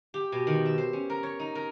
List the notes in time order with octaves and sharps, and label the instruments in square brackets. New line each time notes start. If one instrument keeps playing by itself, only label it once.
[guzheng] G4
B2
D#3
E5
C5
C#4
A#4
C#5
D#4
A#4